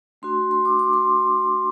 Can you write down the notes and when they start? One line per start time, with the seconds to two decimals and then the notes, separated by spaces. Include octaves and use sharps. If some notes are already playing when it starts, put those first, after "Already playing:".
0.22 A3 D4 F#4 C6
0.51 C6
0.65 D6
0.79 D6
0.93 C6